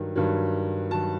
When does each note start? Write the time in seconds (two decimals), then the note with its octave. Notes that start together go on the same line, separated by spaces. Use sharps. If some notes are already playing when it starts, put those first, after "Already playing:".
Already playing: G2 D#3 F#3
0.16 G2 D#3 F#3
0.91 D#3 F#3 A5